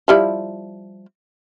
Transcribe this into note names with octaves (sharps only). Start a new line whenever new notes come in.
F3 G3 E4